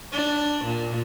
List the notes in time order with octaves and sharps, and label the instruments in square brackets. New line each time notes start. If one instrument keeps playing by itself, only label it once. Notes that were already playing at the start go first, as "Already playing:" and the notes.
[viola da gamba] D4
A#2